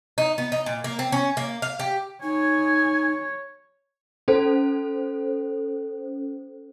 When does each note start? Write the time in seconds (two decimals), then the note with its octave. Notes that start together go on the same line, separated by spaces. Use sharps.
0.18 D#4
0.38 B3
0.52 D#4
0.66 A#2
0.84 A#3
0.99 C4
1.12 C#4
1.37 A#3
1.62 F5
1.79 G4
2.22 D#4 C#5 G#5
4.28 C#4 A4 C5